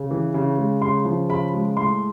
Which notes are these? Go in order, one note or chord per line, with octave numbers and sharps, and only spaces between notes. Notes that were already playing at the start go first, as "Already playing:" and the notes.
Already playing: C#3
E3
C#3
G#3
C#3 C6
F3
C#3 B5
G#3
A2 C6